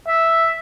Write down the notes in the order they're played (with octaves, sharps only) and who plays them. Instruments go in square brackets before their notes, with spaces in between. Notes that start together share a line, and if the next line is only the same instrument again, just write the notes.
[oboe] E5